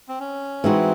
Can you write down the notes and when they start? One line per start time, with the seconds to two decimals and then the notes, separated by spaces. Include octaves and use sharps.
0.08 C4
0.20 C#4
0.64 E3 G#3 C4 D#4 F#4